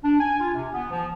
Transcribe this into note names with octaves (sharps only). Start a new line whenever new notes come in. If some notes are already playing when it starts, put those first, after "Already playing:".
D4
G#5
F4
C3
B3
F3